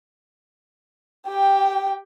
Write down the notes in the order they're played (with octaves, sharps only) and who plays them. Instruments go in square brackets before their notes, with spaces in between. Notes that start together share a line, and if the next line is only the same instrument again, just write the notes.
[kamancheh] G4 G5